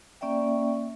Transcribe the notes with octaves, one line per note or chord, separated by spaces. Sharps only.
A#3 C#4 D5 E5 G5